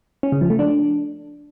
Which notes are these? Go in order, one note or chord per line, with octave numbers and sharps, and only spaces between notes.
C#4
C#3
F3
A3
D4